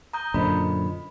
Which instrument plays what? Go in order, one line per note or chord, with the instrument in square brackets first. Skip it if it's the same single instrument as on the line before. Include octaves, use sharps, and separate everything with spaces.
[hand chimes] A#5 D#6 G6
[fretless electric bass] F#2 A#2 D3 [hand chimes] C5 D#5 B5